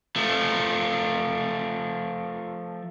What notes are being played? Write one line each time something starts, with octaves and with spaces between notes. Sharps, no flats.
F3 A3